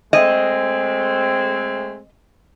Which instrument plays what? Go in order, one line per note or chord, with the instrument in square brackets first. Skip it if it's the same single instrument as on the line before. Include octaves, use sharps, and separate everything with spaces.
[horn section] G#3 A3 C4 [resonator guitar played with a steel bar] D#5